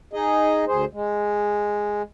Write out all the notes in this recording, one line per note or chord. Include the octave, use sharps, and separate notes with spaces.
D#4 G#4 D#5
D2 G#4 C5
G#3